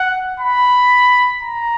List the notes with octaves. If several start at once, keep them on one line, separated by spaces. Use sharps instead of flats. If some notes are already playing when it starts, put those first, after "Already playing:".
Already playing: F#5
B5
A#5